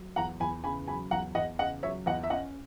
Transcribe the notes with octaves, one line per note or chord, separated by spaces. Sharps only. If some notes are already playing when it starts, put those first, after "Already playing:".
Already playing: F#3
E2 F#5 A#5
E2 G#5 B5
C#3 G#5 B5
F#3 G#5 B5
E2 F#5 A#5
E2 D#5 F#5
C#3 D#5 F#5
F#3 C#5 E5
E2 D#5 F#5
E5
C#4 D#5 F#5